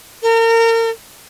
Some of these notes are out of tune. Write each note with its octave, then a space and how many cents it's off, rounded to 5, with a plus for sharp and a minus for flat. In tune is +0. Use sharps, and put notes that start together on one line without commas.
A#4 -35